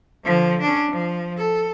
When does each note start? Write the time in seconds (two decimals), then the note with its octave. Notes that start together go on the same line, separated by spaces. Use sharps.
0.25 D3 F3
0.62 C#4 D4
0.91 F3
1.38 A4